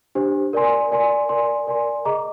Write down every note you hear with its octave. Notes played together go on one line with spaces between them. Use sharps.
D4 G4 C5
A#4 D5 G#5 C6
A#4 D5 G#5 C6
A#4 D5 G#5 C6
A#4 D5 G#5 C6
G#4 D#5 A#5 D6